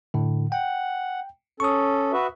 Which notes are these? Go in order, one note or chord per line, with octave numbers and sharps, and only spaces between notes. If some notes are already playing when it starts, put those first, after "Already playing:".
A2 D3
F#5 G5
C#4 A4 C#6 D#6
F#4 B4 E5